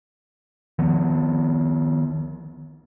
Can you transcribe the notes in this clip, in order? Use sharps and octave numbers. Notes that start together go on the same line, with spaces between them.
D#3 F3 B3